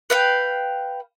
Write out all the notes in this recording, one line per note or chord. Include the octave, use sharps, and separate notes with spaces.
B4 F5 G5